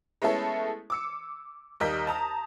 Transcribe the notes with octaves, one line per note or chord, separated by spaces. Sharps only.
G#3 A3 B3 C#4 E4 A4
D6 E6 C#7
D#2 G3 A#4 D#5 G6 B6
A5 A#5 D#6